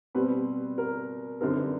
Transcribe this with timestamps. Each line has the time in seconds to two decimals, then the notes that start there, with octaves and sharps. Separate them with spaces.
0.15 B2 G3 C4 B4
0.78 A#4
1.41 F#2 D3 G3 C4 D#4 A#4
1.57 B4